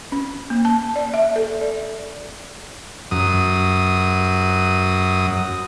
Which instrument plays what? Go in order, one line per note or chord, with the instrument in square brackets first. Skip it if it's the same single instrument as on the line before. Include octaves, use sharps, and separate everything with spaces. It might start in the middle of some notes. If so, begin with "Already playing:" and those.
[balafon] C#4
A#3
A5
D5
E5
A4
D5
[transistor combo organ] F#2 D#6